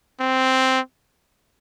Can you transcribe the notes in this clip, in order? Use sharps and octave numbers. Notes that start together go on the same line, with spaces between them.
C4